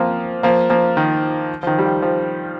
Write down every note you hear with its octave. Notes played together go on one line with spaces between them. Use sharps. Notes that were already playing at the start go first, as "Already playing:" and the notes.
Already playing: F3 A#3 C4
F3 A#3
F3 A#3
D#3
F3
D#3
G3
F3
F3